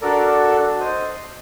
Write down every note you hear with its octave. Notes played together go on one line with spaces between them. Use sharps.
D4 F#4 A4 A#4 D5
C5 D#5